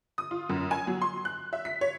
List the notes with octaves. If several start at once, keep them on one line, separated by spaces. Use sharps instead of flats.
D#6
F4
F#2
G#5
F#3
C6
F#6
E5
B6
C#5